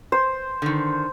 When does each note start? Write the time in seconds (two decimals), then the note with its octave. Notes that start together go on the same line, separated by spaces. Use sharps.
0.12 C5
0.62 D3 D#3